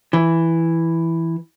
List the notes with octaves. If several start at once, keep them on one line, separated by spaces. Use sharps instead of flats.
E3